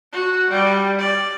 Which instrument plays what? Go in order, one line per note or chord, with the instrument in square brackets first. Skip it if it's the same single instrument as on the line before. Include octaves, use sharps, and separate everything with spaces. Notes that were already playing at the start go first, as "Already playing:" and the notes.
[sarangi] F#4
G3
D5